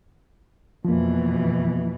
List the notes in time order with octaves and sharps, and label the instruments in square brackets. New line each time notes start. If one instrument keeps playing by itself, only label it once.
[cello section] F2 B2 E3 [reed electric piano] F3 A#3